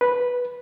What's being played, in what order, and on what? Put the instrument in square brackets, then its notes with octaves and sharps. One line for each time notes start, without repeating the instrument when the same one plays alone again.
[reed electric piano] B4